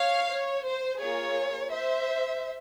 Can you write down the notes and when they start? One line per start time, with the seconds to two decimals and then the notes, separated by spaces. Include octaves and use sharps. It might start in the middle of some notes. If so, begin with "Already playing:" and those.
Already playing: C#5 F5
0.30 C#5
0.64 C5
1.00 A#3 F4 G#4 C#5
1.70 C5 E5